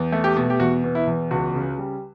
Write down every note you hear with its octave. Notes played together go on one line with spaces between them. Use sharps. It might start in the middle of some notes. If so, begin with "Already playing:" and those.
Already playing: E2
A3
G4
B2
G4
E2 F#4
B2
E4
E2
C#2 F#4
C#3
G3